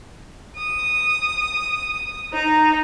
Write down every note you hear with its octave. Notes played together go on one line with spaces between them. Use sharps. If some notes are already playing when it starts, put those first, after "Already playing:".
D#6
D#4